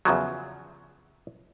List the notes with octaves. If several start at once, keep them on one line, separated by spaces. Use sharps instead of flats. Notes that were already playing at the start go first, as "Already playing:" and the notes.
E2 C#3 F3 F#3